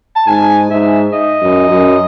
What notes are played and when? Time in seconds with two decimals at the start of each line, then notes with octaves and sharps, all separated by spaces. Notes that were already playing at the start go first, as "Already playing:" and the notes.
0.16 A5
0.27 G#2 G#5
0.70 G#2 E5
1.13 D#5
1.42 F#2
1.70 F#2